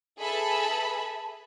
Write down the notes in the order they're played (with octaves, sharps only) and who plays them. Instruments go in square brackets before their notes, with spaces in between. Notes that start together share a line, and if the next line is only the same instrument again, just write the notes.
[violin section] G#4 A4 B4 E5 A5 B5